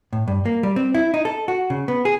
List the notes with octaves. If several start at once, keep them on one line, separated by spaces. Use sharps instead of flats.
A2
G2
A#3
G3
C4
E4
D#4
A4
F#4
C#3
B3
G#4